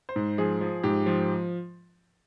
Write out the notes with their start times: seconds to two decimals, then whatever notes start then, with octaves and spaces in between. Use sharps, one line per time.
0.09 C5
0.16 G#2
0.38 F3 G#4
0.61 F3
0.83 G#2 G4
1.06 F3